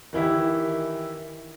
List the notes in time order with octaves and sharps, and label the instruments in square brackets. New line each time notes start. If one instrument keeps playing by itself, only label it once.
[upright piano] D#3 E3 E4 G4